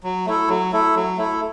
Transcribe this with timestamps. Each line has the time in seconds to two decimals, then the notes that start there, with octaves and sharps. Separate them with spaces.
0.03 F#3
0.26 A3 E4 A4
0.49 F#3
0.72 A3 E4 A4
0.95 F#3
1.17 A3 E4 A4